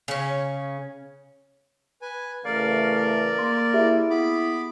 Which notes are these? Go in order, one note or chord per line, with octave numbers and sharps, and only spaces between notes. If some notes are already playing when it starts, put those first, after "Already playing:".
C#3 C#4
B4 G#5
C#3 E3 A3 A#4 D5 F5
A#3 C6
E4 G4 G#4 E5
B3 B5 D6